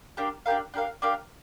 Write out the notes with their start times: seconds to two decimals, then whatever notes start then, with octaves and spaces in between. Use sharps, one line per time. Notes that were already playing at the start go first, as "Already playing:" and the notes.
0.17 D4 G4 A#4 F5
0.46 D4 G4 A#4 F5
0.74 D4 G4 A#4 F5
1.02 D4 G4 A#4 F5